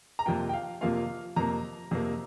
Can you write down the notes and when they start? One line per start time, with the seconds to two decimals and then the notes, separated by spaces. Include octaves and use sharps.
0.19 A#5
0.26 F2 C3 A#3 F4 G5
0.49 G5
0.53 F5
0.81 F2 C3 A#3 F4 F5
1.36 F2 C3 A#3 A#5
1.91 F2 C3 A#3